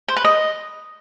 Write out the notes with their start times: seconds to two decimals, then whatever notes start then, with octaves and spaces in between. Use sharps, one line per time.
0.08 C5
0.16 B4
0.25 D#5